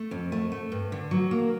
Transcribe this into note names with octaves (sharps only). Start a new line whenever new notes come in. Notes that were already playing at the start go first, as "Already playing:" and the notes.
Already playing: A3
F2
A3
A3
G2
D3
F#3
A#3